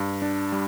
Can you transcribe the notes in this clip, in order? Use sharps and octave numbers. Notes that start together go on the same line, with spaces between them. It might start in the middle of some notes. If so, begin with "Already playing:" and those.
Already playing: G2
D4
G3